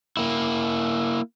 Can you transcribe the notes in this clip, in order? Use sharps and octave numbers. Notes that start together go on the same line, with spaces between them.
A#3 E4